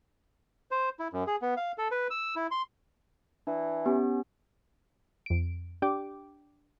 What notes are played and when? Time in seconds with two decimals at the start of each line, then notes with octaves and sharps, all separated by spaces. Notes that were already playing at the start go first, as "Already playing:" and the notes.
0.71 C5
0.99 E4
1.13 F#2
1.27 G#4
1.42 B3
1.57 F5
1.78 A4
1.91 B4
2.10 E6
2.36 E4
2.51 C6
3.47 E3 D4
3.86 B3 C#4 G4
5.26 F2 D7
5.82 D4 G4 G5 D6